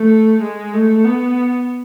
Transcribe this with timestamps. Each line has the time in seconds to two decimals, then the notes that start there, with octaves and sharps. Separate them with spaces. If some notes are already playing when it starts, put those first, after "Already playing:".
Already playing: A3
0.42 G#3
0.74 A3
1.05 B3